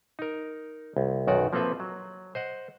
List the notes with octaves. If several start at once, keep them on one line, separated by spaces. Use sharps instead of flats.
D#4 A#4
C2
B1 F#2 D#3 F#4 D5
F3 A#3 C4 A4 B4 E5
F#3
C5 D#5 F#5